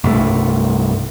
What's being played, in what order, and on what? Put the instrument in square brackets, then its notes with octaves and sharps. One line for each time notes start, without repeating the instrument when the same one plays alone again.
[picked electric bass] C2 G2 A3